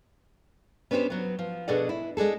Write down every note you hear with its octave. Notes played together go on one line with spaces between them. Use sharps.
B3 C#4 D4 F4 G4 C5
F#3 B3
F3
B2 D4 G#4 A4 D5 F#5
E4
G#3 D4 G#4 A4